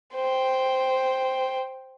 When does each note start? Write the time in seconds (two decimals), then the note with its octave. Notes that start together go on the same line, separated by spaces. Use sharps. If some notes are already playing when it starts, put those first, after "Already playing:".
0.14 C5 G5